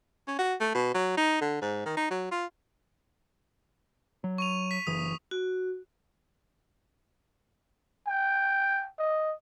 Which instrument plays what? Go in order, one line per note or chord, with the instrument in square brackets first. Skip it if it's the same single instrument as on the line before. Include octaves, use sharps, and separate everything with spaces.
[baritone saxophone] C#4
F#4
A3
B2
F#3
D#4
D3
G#2
D#3
D#4
F#3
F4
[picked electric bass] F#3
[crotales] C#6 D#7 F7
B6
[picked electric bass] F#1 E3 [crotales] D#6
[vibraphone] F#4
[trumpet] G5
D#5